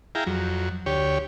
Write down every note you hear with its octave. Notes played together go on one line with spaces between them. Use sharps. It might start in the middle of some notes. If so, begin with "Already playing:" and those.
E4 G#4 F5 G5 A#5
F2 F#3
D2 G4 C#5